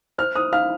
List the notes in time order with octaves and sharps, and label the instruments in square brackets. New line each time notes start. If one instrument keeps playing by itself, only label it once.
[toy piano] C5 [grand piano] F6
[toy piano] C5 [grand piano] D#6
[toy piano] F5 [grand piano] F6